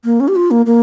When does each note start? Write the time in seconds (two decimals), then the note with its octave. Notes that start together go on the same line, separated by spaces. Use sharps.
0.04 A#3
0.20 C#4
0.28 G4
0.36 F4
0.51 A#3
0.66 A#3